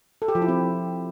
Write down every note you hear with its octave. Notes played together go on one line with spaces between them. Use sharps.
A4
G4
F3
E4
C4